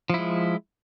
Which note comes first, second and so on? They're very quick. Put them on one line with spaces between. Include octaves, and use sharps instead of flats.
F3 E4 G#3